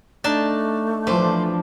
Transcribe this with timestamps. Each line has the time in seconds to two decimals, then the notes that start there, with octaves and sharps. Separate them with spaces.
0.24 A3 D4 D#4 A5
1.07 E3 F3 D4 C5 D5